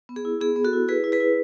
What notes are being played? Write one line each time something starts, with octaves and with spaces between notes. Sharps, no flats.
B3
G#4
E4
B3 G#4
B3
F#4 A4
E4
E4 G#4 B4
E4
G#4 B4
E4